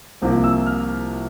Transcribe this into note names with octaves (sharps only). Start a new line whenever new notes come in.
C2 C3 F3 A#3
E6
F6